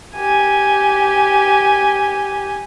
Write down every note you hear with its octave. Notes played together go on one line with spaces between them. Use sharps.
G4 G#5